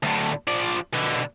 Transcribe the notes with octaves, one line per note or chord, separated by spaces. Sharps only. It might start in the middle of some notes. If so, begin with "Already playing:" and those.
D2 A2
F3 D5
B2 D3